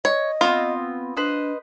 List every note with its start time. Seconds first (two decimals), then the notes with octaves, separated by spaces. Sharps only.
0.05 C#5 D#5
0.41 B3 C4 F4
1.17 D4 B4 C5 D#5